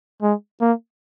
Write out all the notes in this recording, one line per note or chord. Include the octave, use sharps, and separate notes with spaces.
G#3
A#3